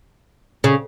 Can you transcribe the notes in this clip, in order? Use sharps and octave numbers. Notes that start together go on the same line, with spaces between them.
C#3